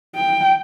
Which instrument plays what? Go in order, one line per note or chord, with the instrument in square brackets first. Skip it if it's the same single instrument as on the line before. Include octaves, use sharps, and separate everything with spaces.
[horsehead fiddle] G5